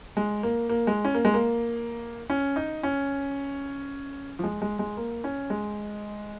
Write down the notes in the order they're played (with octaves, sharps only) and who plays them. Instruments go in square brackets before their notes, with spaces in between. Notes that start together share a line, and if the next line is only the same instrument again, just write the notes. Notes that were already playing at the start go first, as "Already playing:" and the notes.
[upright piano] G#3
A#3
A#3
G#3
C#4
A#3
G#3
A#3
C#4
D#4
C#4
F3
G#3
G#3
G#3
A#3
C#4
G#3